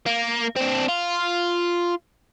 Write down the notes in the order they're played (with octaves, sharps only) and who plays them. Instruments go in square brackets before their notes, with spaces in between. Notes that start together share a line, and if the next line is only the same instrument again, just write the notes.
[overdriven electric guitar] A#3
C4 D4
F4